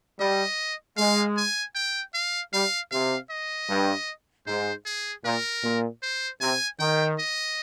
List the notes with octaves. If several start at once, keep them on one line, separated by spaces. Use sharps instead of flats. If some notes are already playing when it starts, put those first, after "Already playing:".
G3 D#5
G#3 F5
G#5
G5
F5
G3 F5
C3 F5
D#5
G2
G#2 C5
G#4
A#2 A#4
A#2
C5
C3 G#5
D#3 G5
D#5